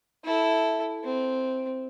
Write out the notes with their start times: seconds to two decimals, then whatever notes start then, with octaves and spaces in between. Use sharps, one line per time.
0.24 E4 A4
1.04 C4